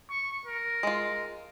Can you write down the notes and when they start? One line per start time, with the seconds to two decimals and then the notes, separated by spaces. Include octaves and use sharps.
0.10 C#6
0.46 A#4
0.83 G#3 F4